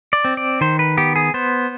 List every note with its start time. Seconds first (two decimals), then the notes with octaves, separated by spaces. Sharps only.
0.13 D5
0.25 C4
0.37 D5
0.61 D#3 C5
0.79 B4
0.97 B3 G4
1.16 G#4
1.34 B3 C5